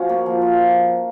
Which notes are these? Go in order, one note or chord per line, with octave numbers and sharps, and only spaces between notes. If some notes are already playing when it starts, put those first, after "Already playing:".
Already playing: F3 C#4 F#4
A#3
F3
F3